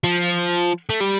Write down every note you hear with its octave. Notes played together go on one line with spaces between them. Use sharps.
F3
A3
G3